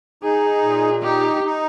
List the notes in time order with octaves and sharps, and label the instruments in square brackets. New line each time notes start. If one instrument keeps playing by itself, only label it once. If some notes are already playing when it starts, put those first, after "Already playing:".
[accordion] D#4 [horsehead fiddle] G#4
[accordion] A#2
[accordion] D#4 [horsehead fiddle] G4
[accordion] D#4